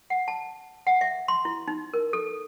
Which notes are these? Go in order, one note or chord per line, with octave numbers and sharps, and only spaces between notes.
F#5
A5
F#5
E5
C6
E4
D#4
A#4
A4